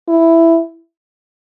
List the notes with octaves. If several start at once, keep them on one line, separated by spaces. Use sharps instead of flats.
E4